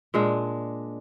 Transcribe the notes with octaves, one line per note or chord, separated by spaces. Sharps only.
A#2 G#3 D4